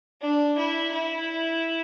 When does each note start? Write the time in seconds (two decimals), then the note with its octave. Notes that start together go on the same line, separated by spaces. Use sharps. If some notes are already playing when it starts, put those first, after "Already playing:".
0.21 D4
0.58 E4
0.92 E4